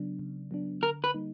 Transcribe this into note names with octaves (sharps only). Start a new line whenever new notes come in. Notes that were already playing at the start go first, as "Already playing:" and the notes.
Already playing: C#3 F#3 B3 D4
C#3
F#3 B3 D4
D3 A#4
B4
G3 A#3 D#4